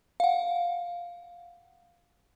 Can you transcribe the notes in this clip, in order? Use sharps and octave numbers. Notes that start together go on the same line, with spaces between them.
F5 F#5